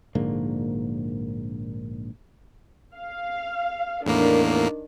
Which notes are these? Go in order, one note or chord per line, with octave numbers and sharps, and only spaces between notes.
A#1 G#2 D3 A#3
F5
E2 A2 D#3 A#3 D4